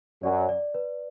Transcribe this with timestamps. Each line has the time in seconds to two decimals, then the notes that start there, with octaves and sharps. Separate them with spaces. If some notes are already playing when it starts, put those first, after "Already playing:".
0.23 F#2 F#3 D5
0.49 D5
0.74 B4